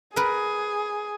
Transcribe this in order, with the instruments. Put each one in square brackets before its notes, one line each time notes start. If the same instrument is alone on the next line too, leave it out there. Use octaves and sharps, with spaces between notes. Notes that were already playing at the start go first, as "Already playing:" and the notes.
[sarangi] G#4 [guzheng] A#4 B4